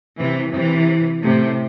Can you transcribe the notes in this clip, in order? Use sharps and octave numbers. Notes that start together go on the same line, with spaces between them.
C3 E3
C3 E3
A2 C3